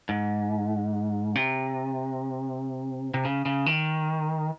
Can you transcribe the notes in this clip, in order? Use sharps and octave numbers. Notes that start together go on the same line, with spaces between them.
G#2
C3
C3
C#3
C#3
D#3